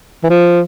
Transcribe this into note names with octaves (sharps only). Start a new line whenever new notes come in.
E3
F3